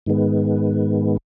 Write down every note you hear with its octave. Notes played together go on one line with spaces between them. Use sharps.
G#2 D#3 G#3 B3